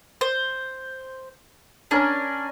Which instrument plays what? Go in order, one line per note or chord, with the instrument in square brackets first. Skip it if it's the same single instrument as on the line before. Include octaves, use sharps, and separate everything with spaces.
[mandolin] C5
[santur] C#4 A#4 G#5 [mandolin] D4